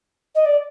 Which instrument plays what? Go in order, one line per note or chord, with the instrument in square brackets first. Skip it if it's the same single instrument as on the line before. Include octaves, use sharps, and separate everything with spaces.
[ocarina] D#5
D5